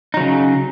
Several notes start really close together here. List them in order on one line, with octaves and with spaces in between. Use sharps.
D#4 F#3 C#3